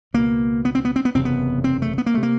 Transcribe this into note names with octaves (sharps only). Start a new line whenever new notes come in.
C#2 B2 A#3
B3
C4
B3
C4
B3
F#1 E2 C3 C4
B3
C4
A3
B3
A#3
C3 A3
A#3